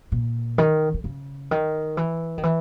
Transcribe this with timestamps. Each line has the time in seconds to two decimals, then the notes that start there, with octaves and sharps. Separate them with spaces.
0.12 A#2
0.58 D#3
0.94 D#3
1.04 C#3
1.51 D#3
1.97 E3
2.38 D#3
2.43 E3